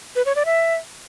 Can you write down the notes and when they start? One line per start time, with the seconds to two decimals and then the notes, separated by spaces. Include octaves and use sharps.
0.16 B4
0.26 C#5
0.36 D5
0.46 E5